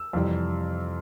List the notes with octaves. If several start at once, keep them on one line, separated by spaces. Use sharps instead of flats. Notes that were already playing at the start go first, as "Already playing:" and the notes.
Already playing: E6
F2 C3 E3 G3